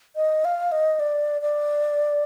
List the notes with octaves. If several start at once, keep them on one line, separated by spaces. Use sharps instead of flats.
D#5
F5
D#5
D5
D5